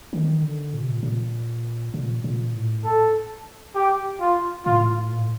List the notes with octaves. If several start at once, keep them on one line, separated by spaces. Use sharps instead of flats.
D#3
D3
A#2
C3
A#2
A#2
A#2
A#2
A2
A4
G4
F4
A2 F4
A#2
A2